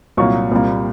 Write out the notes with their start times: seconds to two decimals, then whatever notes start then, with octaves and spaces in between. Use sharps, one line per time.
0.17 C2 A#2 F#3 A#3 C#6
0.51 C2 A#2 G3 A#3